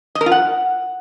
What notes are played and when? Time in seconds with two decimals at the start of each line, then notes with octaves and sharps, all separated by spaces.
0.15 D#5
0.21 A#4
0.26 F4
0.32 F#5